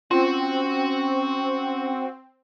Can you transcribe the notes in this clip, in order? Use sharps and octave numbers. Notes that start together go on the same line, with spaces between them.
C4 C#4 F4 F#4